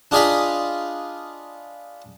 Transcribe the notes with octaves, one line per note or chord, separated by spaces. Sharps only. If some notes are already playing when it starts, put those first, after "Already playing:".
D4 F4 G#4 D#5 F5 B5